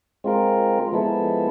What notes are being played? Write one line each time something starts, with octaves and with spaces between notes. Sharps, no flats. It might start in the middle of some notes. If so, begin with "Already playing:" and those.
G#3 C4 F4 A#4
F3 G#3 B3 E4 A4